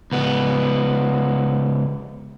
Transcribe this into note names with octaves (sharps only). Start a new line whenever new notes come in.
C#2 B3